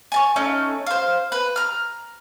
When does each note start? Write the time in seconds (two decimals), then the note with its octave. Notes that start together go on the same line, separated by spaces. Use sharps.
0.12 G#5 A5 C#6
0.36 A3 C#4 D#4
0.86 C5 F5
1.32 B4
1.56 A#5 F6